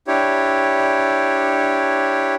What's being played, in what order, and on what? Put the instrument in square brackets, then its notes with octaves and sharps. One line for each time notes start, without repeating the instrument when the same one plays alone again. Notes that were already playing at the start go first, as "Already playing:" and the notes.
[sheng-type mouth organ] D4 E4 G4 C#5